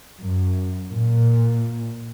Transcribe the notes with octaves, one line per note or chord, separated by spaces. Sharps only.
F#2
A#2